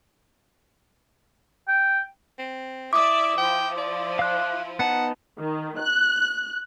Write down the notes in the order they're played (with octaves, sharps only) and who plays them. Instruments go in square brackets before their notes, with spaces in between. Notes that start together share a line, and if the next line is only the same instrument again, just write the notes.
[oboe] G5
[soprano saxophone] C4
[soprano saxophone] E4 [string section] D5 E5 [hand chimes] D6 D#6
[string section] F3 E4 [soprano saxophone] G5
[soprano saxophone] D5
[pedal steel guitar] F5 F#6
[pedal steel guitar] B3 D#4 A5 [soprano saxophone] F#5
[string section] D#3
F#6